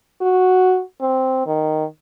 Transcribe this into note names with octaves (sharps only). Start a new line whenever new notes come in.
F#4
C4
D#3